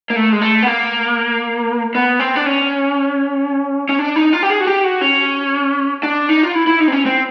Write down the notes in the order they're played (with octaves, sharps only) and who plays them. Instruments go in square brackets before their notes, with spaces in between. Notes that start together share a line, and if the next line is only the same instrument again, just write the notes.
[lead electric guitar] A#3
A3
G#3
A3
B3
A#3
B3
C4
D4
C#4
C#4
D4
D#4
F4
G4
G#4
F#4
G4
F#4
C#4
D4
D#4
F4
E4
E4
D#4
C4
C#4
C4